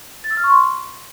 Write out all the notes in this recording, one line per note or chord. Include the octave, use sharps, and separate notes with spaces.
A6
E6
F6
C#6
C6